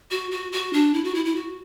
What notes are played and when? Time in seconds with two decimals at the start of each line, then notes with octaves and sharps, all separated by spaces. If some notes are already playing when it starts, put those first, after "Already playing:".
0.11 F#4
0.31 F#4
0.52 F#4
0.73 D4
0.94 E4
1.04 F#4
1.15 E4
1.25 E4
1.36 F#4